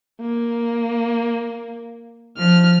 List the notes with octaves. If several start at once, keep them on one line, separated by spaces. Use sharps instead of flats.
A#3
F3 F6